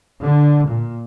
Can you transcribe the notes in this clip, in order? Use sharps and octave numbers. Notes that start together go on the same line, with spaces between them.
D3
A#2